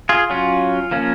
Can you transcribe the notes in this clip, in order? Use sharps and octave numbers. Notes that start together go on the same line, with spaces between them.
F4 G#4
F#3 C#4 F4
F3 A#3 C#4